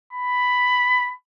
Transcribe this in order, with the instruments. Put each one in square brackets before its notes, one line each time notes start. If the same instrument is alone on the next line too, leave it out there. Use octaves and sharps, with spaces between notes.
[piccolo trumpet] B5